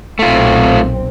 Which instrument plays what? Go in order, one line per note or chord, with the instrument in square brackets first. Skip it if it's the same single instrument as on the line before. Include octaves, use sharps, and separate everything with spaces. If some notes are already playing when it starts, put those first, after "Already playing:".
[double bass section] B1 A#2 C4 [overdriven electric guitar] A3 F4